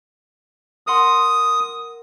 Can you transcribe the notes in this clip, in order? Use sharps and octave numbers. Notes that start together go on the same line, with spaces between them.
A#4 F#5 C6 D#6